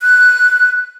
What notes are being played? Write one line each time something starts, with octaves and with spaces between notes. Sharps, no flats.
F#6